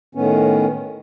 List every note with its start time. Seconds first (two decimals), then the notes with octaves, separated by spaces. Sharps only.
0.15 A2 D#3 B3 C#4